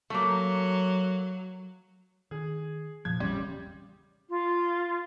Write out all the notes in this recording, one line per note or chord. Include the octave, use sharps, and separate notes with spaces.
F#3 A3 A#3
D#3 G#4
F1 A#2 E3 F3 G#6
E1 A1 C#3 E3 G3 C6
F4